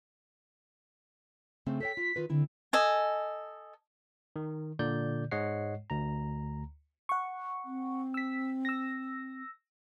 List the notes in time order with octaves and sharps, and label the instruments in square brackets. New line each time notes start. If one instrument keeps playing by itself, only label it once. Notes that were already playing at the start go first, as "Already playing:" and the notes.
[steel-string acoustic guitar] C#3 A3 C4
[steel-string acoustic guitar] A4 C#5 G5 [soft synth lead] B6
[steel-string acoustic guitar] F4
D#3 F4 B4
[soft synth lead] D3 [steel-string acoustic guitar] C4 E4
[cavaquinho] A4 D#5 G#5
[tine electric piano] D#3
A#2 D3 D5 G6
G#2 G#3 C#5 D#5 F#5 C7
D2 A#5
[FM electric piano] F#5 C#6
[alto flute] C4
[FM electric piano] E6 B6
E6 A#6